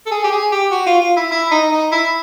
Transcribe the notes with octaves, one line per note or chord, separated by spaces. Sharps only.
A4
G#4
G4
G#4
G4
F#4
F4
F4
E4
E4
D#4
D#4
E4